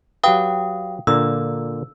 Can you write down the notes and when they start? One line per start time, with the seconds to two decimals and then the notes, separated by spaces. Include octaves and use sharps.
0.24 F#3 G4 B4 F5 G5 D#6
1.07 A#2 D3 A#3 E6